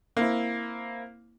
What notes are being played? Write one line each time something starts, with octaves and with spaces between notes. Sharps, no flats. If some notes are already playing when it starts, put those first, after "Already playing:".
A#3 C4 E4